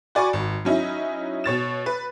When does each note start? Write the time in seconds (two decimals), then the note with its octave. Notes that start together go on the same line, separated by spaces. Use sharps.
0.15 F#4 D5 G#5 B5 C#6
0.33 G#1
0.65 F#3 C#4 D#4 E4
1.44 B2 C#5 A6 E7
1.86 B4